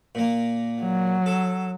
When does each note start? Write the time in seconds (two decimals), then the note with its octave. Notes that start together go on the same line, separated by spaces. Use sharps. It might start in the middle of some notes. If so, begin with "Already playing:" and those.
0.15 A#2 A#3
0.82 F#3
1.26 A4